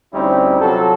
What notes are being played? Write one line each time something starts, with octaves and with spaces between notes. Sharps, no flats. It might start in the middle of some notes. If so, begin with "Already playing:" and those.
D2 G3 C4 C#4 D#4 E4
C3 F#3 F4 A4